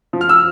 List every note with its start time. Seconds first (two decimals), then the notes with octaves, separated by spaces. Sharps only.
0.13 F3
0.21 F6
0.29 E6